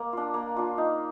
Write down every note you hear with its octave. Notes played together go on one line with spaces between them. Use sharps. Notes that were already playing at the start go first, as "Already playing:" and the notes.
Already playing: A#3
D4 F4
A#3
D4 F4
D#4